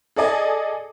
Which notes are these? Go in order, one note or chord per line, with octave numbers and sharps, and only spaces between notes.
G#4 A4 D5 D#5 G#5